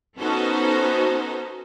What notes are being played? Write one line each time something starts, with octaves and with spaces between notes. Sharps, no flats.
B3 C#4 D#4 F#4 A4 C5